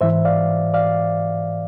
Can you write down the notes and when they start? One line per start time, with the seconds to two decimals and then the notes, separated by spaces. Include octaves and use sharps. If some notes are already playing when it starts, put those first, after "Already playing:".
0.01 G#2 E3 C5 E5
0.25 D5 F5
0.74 D5 F5